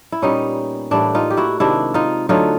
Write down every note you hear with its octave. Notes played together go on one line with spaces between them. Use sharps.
E4
A#2 G3 B3 C#4 D#4
A2 E3 G3 A#3 D4 E4
D#4 F4
G4
E4 F#4
C3 D#3 G#3 D4 E4
D#4 F4
D3 F#3 A3 D#4 F4